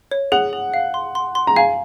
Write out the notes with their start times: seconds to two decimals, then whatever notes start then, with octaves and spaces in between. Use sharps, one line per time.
0.11 C#5
0.32 G#4 F#5
0.53 G#4
0.74 F5
0.94 C6
1.15 C6
1.35 C6
1.47 A#5
1.56 F5 G#5